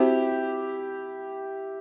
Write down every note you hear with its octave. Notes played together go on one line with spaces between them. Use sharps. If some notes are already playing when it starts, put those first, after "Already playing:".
Already playing: C4 E4 F#4 G4 C5